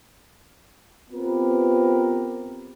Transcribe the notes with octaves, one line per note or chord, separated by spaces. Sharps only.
B3 C4 F4 G4 A#4 B4